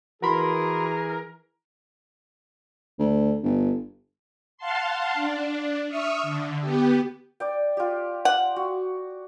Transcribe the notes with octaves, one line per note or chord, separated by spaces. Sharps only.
E3 F#4 G#4 A#4 B5 C6
D2
G1
F5 F#5 A5 C6
D4
E5 C#6 D#6 F6
D3
B3 G4
D5 G5
F4 G4
F#5
F#4